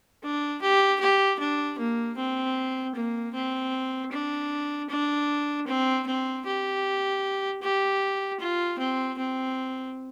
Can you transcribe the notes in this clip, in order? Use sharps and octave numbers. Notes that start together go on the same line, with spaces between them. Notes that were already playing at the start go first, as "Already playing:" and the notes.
D4
G4
G4
D4
A#3
C4
A#3
C4
D4
D4
C4
C4
G4
G4
F4
C4
C4